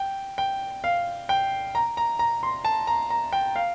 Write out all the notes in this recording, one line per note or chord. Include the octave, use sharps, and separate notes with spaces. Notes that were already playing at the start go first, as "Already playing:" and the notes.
Already playing: G5
G5
F5
G5
A#5
A#5
A#5
C6
A5
A#5
A#5
G5
F5